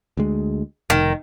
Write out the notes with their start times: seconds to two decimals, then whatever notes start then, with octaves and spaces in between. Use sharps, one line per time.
0.17 D2 G#3
0.90 F1 D#3